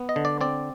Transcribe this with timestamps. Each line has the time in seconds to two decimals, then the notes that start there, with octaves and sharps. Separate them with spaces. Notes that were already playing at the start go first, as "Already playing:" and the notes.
Already playing: B3
0.09 D#5
0.16 D3
0.25 D5
0.41 C4 D5